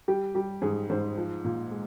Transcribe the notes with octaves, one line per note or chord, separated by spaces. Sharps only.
G3 G4
G3 G4
G#2 G#4
G#2 C5
F3
A#2
G#3